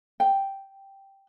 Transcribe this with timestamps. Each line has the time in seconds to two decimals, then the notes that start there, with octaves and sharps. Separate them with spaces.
0.20 G5